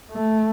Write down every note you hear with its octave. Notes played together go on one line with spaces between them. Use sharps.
A3